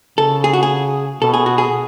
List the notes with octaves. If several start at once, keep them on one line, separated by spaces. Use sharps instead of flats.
C#3 A4
G#4
F#4
G#4
B2 A4
G#4
F#4
G#4